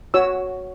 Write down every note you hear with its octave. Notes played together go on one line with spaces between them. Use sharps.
F#4 C#5 E6